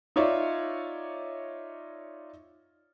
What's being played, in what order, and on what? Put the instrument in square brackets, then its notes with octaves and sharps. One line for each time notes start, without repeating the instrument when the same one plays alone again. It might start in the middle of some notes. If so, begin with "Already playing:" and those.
[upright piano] D#4 F4 C#5 D5 E5